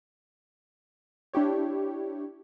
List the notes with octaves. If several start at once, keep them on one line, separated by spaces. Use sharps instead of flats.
D4 E4 G4 C#5